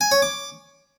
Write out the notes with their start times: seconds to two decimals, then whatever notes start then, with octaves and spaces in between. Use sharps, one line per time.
0.01 G#5
0.12 C#5
0.22 D6